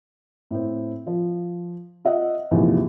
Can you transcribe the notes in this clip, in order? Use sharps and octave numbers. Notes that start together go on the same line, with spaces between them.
A2 C4
F3
F4 D#5 E5 F#5
A#1 E2 G#2 C3 E3 F3